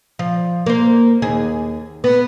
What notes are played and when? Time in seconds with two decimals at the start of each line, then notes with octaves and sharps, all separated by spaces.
0.19 F3
0.66 A#3 C5
1.22 D#2 G#4
2.04 B3